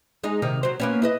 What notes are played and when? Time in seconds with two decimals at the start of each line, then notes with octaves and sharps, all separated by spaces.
0.24 G#3 D#4
0.42 C3 D#3 D#4
0.63 F#3 C5
0.80 A#3 B3 C#4
1.02 E4 B4 D#5